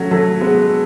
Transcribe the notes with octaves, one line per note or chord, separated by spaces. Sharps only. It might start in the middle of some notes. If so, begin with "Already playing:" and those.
Already playing: F#3 A3 C#4
F#3 A3
G#3 B3